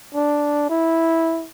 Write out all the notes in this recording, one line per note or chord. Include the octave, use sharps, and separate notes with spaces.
D4
E4